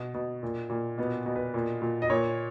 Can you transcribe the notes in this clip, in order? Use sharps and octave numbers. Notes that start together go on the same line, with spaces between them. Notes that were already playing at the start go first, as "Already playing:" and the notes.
Already playing: B2
B2
A#2
A#2
B2 B3
B2
B4
A#2
A#2
D#5
A#2 C#5